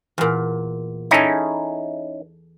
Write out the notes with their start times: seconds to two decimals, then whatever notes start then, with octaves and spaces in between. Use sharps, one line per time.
0.18 E2 A#2
1.11 C#4 D#4 E4 G#4 A4